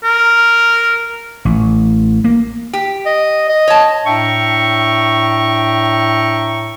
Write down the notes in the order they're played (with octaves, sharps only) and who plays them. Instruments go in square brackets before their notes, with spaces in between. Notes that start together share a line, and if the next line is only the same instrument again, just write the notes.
[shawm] A#4
[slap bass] A1
A#3
[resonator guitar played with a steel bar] G4
[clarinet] D#5
D#5
[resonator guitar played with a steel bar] C#5 A5
[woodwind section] A2 D4 E5 G5 A#5 C#6